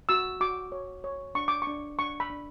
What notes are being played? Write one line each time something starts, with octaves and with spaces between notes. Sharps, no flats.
F#4 E6
F#4 D6
C#5
C#5
D4 C#6
D6
C#6
D4
D4 C#6
B5
D4